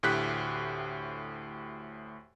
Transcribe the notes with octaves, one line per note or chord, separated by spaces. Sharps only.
D2 A2 G4 F#6 B6